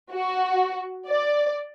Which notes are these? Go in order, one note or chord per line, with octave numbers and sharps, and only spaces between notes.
F#4
D5